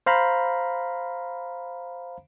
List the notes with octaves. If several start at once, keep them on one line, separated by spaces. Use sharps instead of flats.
C5 F5 A#5 B5